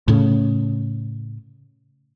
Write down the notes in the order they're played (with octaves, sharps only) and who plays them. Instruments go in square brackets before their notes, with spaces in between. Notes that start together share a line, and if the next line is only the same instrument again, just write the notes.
[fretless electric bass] A2 C#3